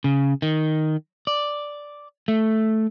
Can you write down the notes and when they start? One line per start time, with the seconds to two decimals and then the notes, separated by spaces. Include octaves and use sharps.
0.04 C#3
0.42 D#3
1.27 D5
2.28 A3